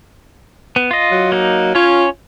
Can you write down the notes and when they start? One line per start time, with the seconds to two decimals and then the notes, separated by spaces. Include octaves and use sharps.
0.76 B3
0.91 F4 D#5
1.11 F#3
1.32 A#3 D#4
1.75 C#4 F4 C#5